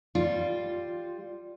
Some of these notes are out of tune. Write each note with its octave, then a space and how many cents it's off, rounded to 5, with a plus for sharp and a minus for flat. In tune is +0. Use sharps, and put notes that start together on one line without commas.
G3 +0 F4 +0